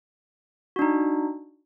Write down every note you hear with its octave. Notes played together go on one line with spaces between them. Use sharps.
D4 D#4 F#4